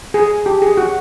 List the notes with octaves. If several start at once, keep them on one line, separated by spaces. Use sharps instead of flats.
G#4
G4
G#4
F#4